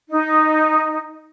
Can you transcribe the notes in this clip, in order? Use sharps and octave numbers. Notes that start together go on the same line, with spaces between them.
D#4